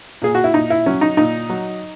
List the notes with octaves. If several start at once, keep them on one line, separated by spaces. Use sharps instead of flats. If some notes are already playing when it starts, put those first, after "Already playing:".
A#2 G#4
F#4
E4
A#2 D#4
E4
F#3 C#4
D#4
A#2 D#4
F#3